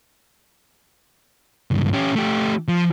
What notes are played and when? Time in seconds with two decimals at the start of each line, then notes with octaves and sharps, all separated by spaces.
1.71 C#2 G2
1.93 C#4 G4
2.15 A3 G4
2.68 F3